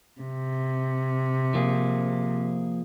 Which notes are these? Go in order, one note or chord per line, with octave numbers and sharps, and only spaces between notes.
C3
F3 A#3 G#4